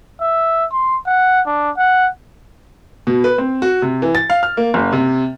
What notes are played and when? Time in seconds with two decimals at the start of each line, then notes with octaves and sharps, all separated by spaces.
0.21 E5
0.72 C6
1.06 F#5
1.47 D4
1.77 F#5
3.07 B2
3.24 B4
3.38 C4
3.62 F#4
3.82 C3
4.02 E3
4.15 A6
4.30 F5
4.43 F6
4.57 A#3
4.74 F#1
4.93 C3